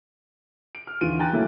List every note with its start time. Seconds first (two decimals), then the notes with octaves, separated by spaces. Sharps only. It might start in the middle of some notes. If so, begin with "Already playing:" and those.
0.75 D7
0.87 F6
1.01 D#2 D3 E3 F4 D7 D#7
1.19 G5 G#5 A#5 F#6 A6
1.33 F#3 A3 A#3 E4